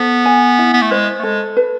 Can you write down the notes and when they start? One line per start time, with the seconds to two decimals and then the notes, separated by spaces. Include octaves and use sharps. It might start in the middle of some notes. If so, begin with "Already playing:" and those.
Already playing: B3 A4 C5
0.25 G#5
0.59 E4
0.73 B3
0.82 A3
0.91 G#3 C5
1.19 A3
1.23 G#3 A4
1.57 B4